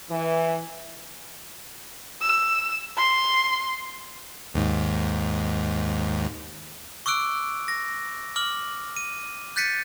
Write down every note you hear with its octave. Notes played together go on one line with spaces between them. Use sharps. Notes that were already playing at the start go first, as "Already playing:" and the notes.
E3
E6
C6
D#2 G#2
C#6 D6 E6 F#6 D7
A#6
D6 F6 F#7
D#7
F#6 G6 A6 B6 C#7 D#7